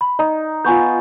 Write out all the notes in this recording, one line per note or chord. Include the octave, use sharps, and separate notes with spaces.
B5
D#4 D#5
B3 F4 G#5 C#6 G6